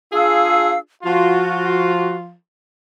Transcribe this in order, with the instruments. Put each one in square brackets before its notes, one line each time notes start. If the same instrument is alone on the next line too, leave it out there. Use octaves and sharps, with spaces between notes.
[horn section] D4 F4 G#4 [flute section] F5 E6
[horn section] F3 F4 [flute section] F#4